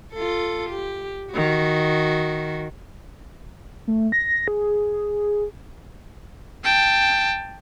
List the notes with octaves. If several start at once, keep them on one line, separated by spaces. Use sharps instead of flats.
F4 A4
G4
D#3 F#4
A3
A#6
G#4
G5 A5